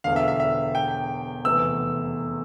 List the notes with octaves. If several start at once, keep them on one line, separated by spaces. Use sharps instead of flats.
E1 E2 D3 F5
E5
E5
E5
G5
F1 E2 C3 E3 E6